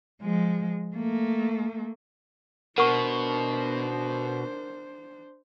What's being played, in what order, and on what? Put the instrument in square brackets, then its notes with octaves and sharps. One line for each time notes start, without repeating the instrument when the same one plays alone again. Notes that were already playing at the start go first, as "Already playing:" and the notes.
[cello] F3 G#3
A3 A#3
[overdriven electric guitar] B2 [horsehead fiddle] D4 C5 [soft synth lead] A#4 [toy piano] F#5 C#6